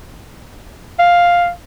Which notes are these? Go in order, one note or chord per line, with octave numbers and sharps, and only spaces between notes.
F5